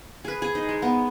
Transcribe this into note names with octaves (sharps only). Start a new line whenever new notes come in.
G#4 B4
G#4
D#4
G#3
B3